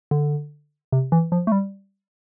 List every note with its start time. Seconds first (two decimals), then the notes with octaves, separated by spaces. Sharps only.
0.11 D3
0.92 C3
1.12 E3
1.32 F3
1.47 A3
1.52 G3